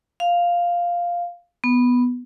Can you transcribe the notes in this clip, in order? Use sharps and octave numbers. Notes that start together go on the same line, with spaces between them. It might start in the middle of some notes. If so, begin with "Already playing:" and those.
F5
B3